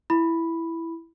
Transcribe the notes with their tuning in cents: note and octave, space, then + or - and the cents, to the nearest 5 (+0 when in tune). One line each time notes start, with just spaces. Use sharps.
E4 +5 B5 +0